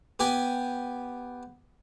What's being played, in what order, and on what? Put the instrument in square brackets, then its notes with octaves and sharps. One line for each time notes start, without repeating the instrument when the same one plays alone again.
[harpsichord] B3 G4 G#5